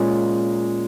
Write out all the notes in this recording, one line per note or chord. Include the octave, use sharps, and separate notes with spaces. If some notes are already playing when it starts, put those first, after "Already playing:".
Already playing: A#2 G#3 C#4 F4